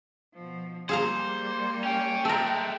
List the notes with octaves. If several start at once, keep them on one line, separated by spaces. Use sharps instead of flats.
B2 F3
G3 A#3 G#4 C5 F5 A#5
C#4 G5
G#3 A3 A4 A#4